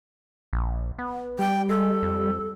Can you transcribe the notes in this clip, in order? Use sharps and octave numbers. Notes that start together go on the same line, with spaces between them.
A#1
B3
G3 G5
G#3 A4
F2